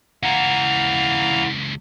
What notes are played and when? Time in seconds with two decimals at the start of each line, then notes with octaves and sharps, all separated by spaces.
0.23 C#2 E3 E4 F5 F#5 A#5